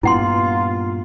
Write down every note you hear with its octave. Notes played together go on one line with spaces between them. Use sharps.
G2 A#2 B3 E4 F4 F#5 C6